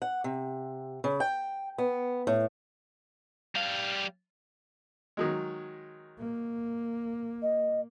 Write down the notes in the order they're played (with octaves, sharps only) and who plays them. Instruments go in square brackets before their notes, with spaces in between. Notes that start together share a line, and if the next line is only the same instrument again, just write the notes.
[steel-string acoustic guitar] F#5
C3
C#3
G5
B3
A2
[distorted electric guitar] G3 F5
[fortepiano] D#3 F#3 G#3
[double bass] A#3
[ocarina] D#5